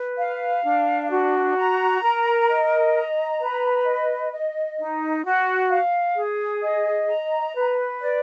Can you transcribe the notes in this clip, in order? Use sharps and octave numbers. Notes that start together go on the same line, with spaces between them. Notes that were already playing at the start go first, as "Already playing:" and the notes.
Already playing: B4
F5
D4
F#4
A#5
A#4
D#5
A#5
B4
D#5
D#5
D#4
F#4
F5
G#4
D#5
A#5
B4
D5